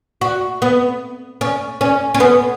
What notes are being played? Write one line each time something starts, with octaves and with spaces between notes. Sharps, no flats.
F#4
B3
C#4
C#4
C#4
B3